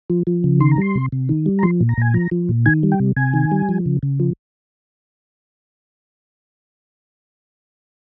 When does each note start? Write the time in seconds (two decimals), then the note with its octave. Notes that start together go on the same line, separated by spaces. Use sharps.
0.10 F3
0.27 F3
0.44 C#3
0.60 D#3 C6
0.71 A#5
0.78 G3 C6
0.95 C3
1.12 C3
1.29 D#3
1.46 G3
1.59 A#5
1.63 F3 C6
1.81 A#2
1.89 A#5
1.97 A#2 G#5
2.14 F3 A#5
2.31 F3
2.49 A#2
2.66 D#3 G#5
2.83 G3
2.92 G5
3.00 C3
3.17 C3 G#5
3.34 D#3
3.52 G3
3.69 F3
3.86 C#3
4.03 C#3
4.20 F3